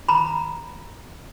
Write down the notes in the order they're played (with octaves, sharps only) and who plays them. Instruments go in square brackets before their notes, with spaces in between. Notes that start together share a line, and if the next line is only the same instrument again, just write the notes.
[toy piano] A#5 B5